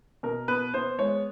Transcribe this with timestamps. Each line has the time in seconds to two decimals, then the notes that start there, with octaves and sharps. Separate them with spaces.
0.23 B2 A#4
0.48 B3 B4
0.74 B3 C5
0.99 G#3 C#5